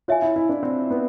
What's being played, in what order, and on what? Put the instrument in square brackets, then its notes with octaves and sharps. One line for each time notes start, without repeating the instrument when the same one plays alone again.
[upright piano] F4 [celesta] C#5 E5 G#5
[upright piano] E4
E4
D4
C4
B3